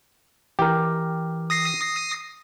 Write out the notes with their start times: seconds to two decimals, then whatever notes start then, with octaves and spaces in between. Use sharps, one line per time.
0.59 E3 G4 A#4 G5
1.50 D#6 A#6 C7